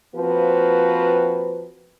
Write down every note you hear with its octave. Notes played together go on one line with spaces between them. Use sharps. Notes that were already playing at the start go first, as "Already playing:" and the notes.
F3 A#3 C4 F#4 B4